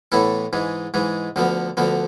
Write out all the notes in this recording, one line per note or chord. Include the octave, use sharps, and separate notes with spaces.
A2 E3 B3 E4 A4
G#2 E3 G#3
G#2 E3 G#3
D2 D3 F3 B3
D2 D3 F3 B3